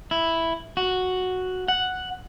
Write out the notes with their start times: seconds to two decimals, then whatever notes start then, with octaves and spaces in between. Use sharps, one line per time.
0.11 E4
0.77 F#4
1.68 F#5